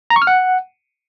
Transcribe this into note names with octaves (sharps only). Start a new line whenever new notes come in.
A#5
C#6
F6
F#5